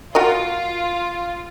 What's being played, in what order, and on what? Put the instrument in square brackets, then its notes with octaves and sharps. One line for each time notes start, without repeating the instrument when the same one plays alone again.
[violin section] F4 [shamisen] F#4 A#4 D#5